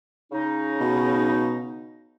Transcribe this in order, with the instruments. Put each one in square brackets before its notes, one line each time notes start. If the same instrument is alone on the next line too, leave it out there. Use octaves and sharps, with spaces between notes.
[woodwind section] C#3 D#4
[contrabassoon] B2